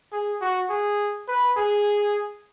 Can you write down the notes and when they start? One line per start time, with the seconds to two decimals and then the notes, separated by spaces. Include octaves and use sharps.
0.13 G#4
0.41 F#4
0.70 G#4
1.28 B4
1.57 G#4